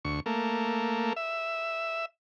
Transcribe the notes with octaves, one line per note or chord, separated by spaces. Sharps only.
D2 C#6
A3 A#3
E5